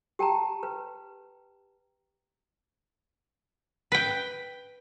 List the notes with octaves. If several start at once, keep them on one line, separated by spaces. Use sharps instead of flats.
G4 G5 A5 A#5
B4
B4 G5